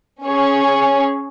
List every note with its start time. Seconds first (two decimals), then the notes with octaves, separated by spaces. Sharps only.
0.24 C#4 G#4 C#5